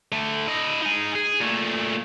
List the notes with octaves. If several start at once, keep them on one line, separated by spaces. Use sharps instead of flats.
D3 A3
E4 D#5
D#4 G#5
G#4
A#2 A3